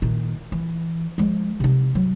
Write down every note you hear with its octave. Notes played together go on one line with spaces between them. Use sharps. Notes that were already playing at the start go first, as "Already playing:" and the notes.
A#2 D#3
E3
F3 G#3
C3 D#4
F#3